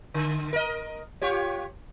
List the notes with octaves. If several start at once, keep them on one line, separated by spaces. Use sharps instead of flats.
D3
A#4 D#5
F4 G4 C#5